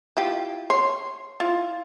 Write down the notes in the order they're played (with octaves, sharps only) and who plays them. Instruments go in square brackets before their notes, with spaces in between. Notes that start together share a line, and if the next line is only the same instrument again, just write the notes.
[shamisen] E4 F4 G4
[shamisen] C#5 [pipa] C6
[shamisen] E4 [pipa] F4